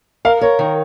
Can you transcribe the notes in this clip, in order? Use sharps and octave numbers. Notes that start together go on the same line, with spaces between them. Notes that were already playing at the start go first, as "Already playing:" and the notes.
A#4 F5
A#4 C#5
D#3